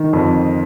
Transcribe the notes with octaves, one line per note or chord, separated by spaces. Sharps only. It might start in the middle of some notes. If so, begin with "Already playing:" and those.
Already playing: D#3
F2